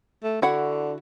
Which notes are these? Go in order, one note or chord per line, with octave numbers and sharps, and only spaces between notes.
A3
D3 E4 F#4 F#5